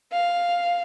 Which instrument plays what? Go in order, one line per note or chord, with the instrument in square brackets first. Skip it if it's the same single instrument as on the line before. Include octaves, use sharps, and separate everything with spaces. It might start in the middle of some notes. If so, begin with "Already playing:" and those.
[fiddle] F5